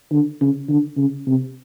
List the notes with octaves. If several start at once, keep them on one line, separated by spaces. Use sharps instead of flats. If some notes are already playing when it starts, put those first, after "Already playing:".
D3
C#3
D3
C#3
C3